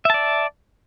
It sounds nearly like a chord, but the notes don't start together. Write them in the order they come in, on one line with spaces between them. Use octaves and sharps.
E5 A5 D5